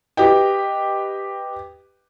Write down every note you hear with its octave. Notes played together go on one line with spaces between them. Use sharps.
G4 B4 D#5 G5